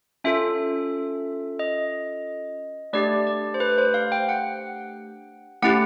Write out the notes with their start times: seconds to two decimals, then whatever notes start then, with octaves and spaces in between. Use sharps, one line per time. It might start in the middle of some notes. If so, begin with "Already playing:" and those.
0.24 C#4 F4 A4 E5
1.59 D#5
2.93 A3 D4 G4 D5
3.27 D5
3.54 C5
3.60 B4
3.78 C5
3.94 F5
4.12 G5
4.29 F#5
5.62 A3 C#4 E4 G4 F#5